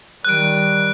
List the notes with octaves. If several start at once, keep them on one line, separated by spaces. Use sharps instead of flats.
D#3 G3 F#6 D7